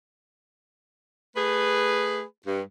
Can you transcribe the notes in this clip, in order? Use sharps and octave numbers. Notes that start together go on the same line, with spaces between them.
A3 G#4 B4
G2